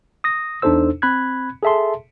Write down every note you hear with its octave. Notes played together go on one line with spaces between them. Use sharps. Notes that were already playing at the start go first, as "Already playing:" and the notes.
D#6 A#6
E2 D4 D#4 A4 C5 E6
C4 B5 F#6 G#6
G#4 A4 E5 A5 C6